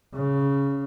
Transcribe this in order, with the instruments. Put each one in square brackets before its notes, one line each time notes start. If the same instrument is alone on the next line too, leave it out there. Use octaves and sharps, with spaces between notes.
[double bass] C#3